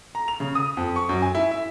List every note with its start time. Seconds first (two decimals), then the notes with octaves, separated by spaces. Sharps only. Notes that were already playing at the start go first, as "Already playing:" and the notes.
0.15 A#5
0.28 F7
0.40 C#3
0.55 D#6
0.77 F2
0.96 C#6
1.09 F#2
1.22 G#5
1.35 E4
1.51 E5